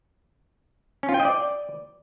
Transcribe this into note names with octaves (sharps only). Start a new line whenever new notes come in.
C#4
F4
G5
D#5
D5